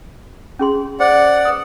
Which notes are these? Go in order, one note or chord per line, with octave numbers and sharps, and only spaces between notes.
C#4 G#4 C6
C5 D5 F#5
B4 D#6